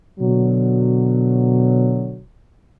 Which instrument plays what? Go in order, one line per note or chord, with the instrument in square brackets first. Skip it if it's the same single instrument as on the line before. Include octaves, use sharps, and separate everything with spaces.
[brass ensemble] B2 D3 F#3